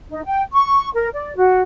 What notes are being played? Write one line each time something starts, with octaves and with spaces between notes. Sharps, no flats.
D#4
G5
C#6
A#4
D5
F#4